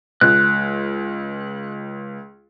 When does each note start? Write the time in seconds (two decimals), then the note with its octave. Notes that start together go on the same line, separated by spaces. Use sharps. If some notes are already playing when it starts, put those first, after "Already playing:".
0.21 C#2 F#6